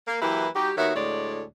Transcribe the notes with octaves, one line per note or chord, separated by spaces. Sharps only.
A#3
E3 F#3 A#3 E4 G4 B4
G3 D#4 F#4 G4
D#2 D#3 B3 F#4 C#5 E5
D2 A2 G#3 C#5 D5